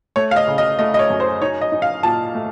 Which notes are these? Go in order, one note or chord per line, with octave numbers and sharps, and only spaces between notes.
A3 C#5
F5
D#5
C#3
D#5
A3 D#5
D#5
C#5
F#2
C5
D#4 C#5
D#5
D#4
F5
A#2 A5
A3